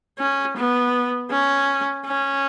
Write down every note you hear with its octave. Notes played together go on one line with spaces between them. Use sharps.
C#4
B3
C#4
C#4